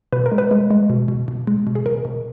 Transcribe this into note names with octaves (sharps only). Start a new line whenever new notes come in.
B2 B4
A#4
G#3
B4
G#3
G#3
B2
B2
B2
G#3
B2
G#4
B2 A#4
B2